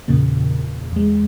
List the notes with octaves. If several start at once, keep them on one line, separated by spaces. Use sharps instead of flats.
E2 A#2 C#3 A#3
E2 G#3